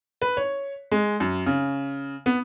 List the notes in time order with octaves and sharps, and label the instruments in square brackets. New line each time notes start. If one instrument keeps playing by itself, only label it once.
[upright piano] B4
C#5
G#3
F#2
C#3
B3